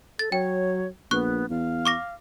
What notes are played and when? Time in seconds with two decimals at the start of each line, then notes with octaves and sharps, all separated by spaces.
0.19 A4 A6
0.32 F#3 C#5 G5
1.11 A#1 B3 C#6 F#6
1.50 E2 F5
1.85 C#6 D6 A#6